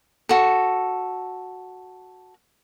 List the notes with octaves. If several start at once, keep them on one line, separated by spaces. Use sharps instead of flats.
F#4 A4